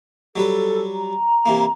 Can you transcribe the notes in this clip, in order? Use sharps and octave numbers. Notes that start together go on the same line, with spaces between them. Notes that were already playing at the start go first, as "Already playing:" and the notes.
F#3 G3 A4 B4
A#5
C3 E3 A#3